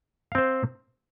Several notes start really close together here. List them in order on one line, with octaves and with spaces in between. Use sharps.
F5 C4 C5